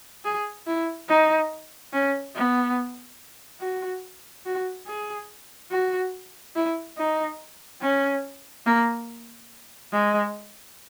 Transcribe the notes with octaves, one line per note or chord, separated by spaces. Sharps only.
G#4
E4
D#4
C#4
B3
F#4
F#4
G#4
F#4
E4
D#4
C#4
A#3
G#3